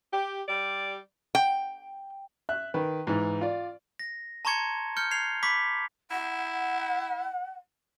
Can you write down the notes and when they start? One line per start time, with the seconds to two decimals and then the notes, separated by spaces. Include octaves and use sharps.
0.12 G4
0.47 G3 G4 D5
1.35 G5
2.49 E5 F#6
2.74 D#3 B4
3.07 G#2 E3
3.41 F4 D5
3.99 A#6
4.45 A5 A#5 C6 C#6 G#6 C#7
4.97 F6 G6 C#7 G7
5.11 G#6 C7 F7
5.43 B5 C#6 D6 B6
6.11 E4 F#5